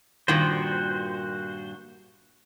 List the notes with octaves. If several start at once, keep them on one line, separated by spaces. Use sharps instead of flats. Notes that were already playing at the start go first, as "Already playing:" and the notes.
G2 A#2 D#3 F#4 C5